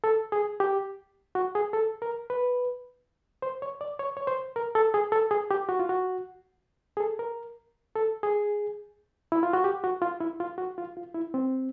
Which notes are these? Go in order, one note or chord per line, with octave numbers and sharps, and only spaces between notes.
A4
G#4
G4
F#4
G#4
A4
A#4
B4
C5
C#5
D5
C#5
C#5
C5
A#4
A4
G#4
A4
G#4
G4
F#4
F4
F#4
G#4
A4
A#4
A4
G#4
E4
F4
F#4
G4
F#4
F4
E4
F4
F#4
F4
F4
E4
C4